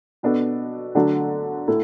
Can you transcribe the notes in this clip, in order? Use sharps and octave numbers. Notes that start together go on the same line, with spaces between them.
B2 B3 D4 F#4 A4
D3 F#3 A3 D4 F#4
A2 A3 E4 A4